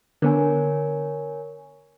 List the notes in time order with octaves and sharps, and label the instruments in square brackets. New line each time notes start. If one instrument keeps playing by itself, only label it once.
[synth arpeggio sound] D3 B3 [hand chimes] A#4 C#5 G#5